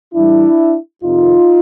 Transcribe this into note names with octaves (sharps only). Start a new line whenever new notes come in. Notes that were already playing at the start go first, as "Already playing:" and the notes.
A2 E3 G3 D4 E4
F2 C3 D#3 D#4 F4